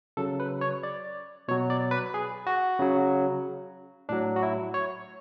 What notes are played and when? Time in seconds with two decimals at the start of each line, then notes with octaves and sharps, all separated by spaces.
0.17 C#3 F#3 A4
0.40 B4
0.61 C#5
0.83 D5
1.48 B2 F#3 C#5
1.70 D5
1.91 B4
2.14 G#4
2.47 F#4
2.79 C#3 F#3
4.09 A2 F#3 D4
4.36 F#4
4.43 E4
4.74 C#5